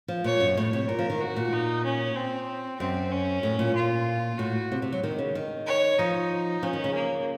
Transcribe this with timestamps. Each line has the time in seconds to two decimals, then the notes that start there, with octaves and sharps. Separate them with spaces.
0.08 F3
0.24 A#2 C#5
0.40 F#2
0.57 A2 C#5
0.73 C3
0.89 A#2 A#4
0.99 F3
1.10 D#3
1.21 F#4
1.36 A#2
1.53 D#4
1.84 C#4
2.16 C4
2.80 F#2 C4
3.12 C#4
3.43 A2
3.59 A#2
3.75 F4
4.39 A2 F#4
4.72 C3
4.82 C3
4.93 F#3
5.03 D#3
5.19 C#3
5.35 D#3
5.67 C#5
5.99 F3 D#4
6.62 F3 C#4
6.73 D#3
6.84 C#3
6.94 A#3